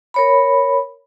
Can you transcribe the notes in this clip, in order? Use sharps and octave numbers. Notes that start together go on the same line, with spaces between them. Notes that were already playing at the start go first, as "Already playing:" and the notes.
A#4 C#5 B5